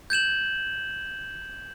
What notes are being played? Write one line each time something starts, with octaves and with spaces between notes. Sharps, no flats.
G6 G#6 E7 F#7